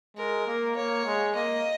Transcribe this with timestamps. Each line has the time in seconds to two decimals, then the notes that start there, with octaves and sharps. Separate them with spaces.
0.17 G#3 A#4
0.47 A#3
0.76 A#3 C#5
1.06 G#3
1.35 A#3 D#5